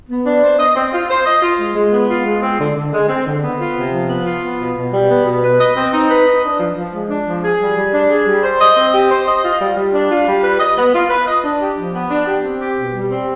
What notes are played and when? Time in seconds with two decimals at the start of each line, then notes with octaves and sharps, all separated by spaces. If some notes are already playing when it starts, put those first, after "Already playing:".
0.09 B3
0.26 D4
0.43 C5
0.58 D#5
0.76 C4
0.93 F4
1.09 C5
1.25 D#5
1.42 F4
1.59 G#3
1.75 G#3
1.92 B3
2.09 F4
2.25 G#3
2.43 C4
2.59 D3
2.76 D3
2.93 G#3
3.09 C4
3.26 D3
3.43 B3
3.59 F4
3.76 C3
3.92 F3
4.09 B3
4.26 F4
4.43 B3
4.59 B2
4.76 B2
4.92 G3
5.09 B3
5.25 B2
5.42 B4
5.59 D#5
5.75 C4
5.93 D#4
6.09 B4
6.27 D#5
6.43 D4
6.60 F3
6.75 F3
6.93 G#3
7.09 D4
7.26 F3
7.43 G#4
7.60 G3
7.77 G3
7.93 D4
8.09 G#4
8.26 G3
8.43 C5
8.60 D#5
8.76 C4
8.93 G4
9.10 C5
9.27 D#5
9.43 F4
9.60 G3
9.76 G3
9.93 D4
10.10 F4
10.26 G3
10.44 B4
10.59 D#5
10.77 B3
10.93 F4
11.09 B4
11.26 D#5
11.44 D4
11.60 G4
11.77 F3
11.94 B3
12.09 D4
12.26 G4
12.44 C4
12.60 G4
12.76 B2
12.94 G3
13.10 C4